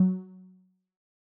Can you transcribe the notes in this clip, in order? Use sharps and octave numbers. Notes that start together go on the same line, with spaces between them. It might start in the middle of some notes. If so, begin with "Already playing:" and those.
Already playing: F#3